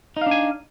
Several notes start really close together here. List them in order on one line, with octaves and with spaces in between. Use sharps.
D#4 F5 D4 G#5